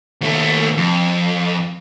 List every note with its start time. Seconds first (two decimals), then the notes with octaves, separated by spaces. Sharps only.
0.21 D#2 A3
0.77 F2